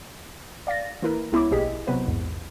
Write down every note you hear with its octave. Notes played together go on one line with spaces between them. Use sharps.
D5 F5 A6 A#6
E3 A#3 E4 A#4 B4
C#2 B3 E4 C#5 B5 D6
A#1 B2 G4 G#4 D#5 B6
C3 F#3 B3 B4 C5
A#1 E2 G#2